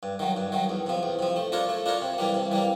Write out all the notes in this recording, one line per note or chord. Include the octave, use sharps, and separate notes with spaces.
G2
D#3 F#3
G2
D#3 F#3
E2
C3 F3
E2
C3 F3
A3
D4 F4 A#4 C#5
A3
D4 F4 A#4 C#5
C3
E3 G3 A#3
C3
E3 G3 A#3